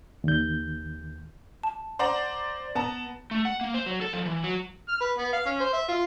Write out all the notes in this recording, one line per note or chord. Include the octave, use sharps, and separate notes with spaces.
D#2 G6
A5
C5 D5 F#5 A#5
B3 A5 A#5
A3
F#5
A#3
C5
F#3
A4
F3
E3
F#3
F6
B4
B3
F5
C#4
C5
E5
F4